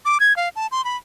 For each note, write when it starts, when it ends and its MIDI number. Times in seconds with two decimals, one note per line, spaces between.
0.05 0.18 86
0.20 0.35 92
0.36 0.49 77
0.56 0.67 81
0.72 0.84 84
0.85 0.97 83